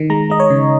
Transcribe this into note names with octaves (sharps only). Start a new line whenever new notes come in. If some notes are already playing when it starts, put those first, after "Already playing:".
Already playing: D#3
G#3 A#5
G#3 D#5
C#5
C#3